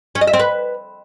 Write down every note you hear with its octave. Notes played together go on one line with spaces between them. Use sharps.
C#4
D#5
E5
C4
B4